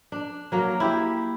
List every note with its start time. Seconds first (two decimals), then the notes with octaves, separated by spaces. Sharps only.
0.12 D4
0.52 F#3 A#3
0.80 E4 G4